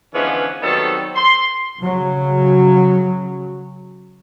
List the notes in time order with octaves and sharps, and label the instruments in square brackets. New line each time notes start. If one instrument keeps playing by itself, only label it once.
[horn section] D3 E3 F3 G#3 B3 C#4
D#3 F#3 G3 B3 C4 A4
C6
[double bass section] C#3 F#3